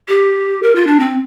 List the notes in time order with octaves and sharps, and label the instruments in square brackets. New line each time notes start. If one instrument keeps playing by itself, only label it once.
[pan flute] G4
A#4
F4
D4
C4